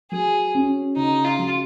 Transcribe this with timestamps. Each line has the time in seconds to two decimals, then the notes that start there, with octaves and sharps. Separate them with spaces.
0.12 F#3 G#4
0.55 C#4
0.96 C#3 D#4
1.24 F4
1.39 F#3